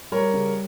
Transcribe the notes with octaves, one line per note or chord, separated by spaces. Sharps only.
G3 A#4 C#5
C#3